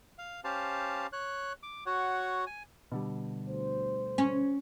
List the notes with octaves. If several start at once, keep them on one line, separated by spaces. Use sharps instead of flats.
F5
C#4 G4 C5 F5 A5
C#5 F#6
D6
F#4 C#5 F#5
G#5
B2 D3 G3
D2 C5
C#4